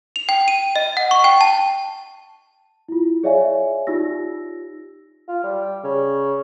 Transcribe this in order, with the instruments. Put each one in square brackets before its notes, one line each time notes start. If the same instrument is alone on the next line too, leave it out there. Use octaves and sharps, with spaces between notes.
[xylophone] F7
G5
D#7
D#5
F#5
C#6
G5
A5
[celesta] E4 F4
G#4 C#5 D5 E5 F5 G#5
D#4 F4 G4 E6 A#6
[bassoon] F4
G3
C#3